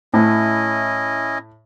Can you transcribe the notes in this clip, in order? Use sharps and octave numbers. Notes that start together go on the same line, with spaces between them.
A2 C#4 E4 D#5